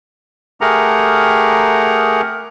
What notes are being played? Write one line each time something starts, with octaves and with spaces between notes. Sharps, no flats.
A3 G4 G#4 A#4 F#5 A#5